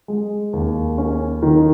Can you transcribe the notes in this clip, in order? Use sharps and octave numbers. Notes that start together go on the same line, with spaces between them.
G#3
D#2
C#4
D#3